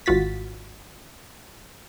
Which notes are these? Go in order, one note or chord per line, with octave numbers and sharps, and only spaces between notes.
G#1 F4 F#4 A6 B6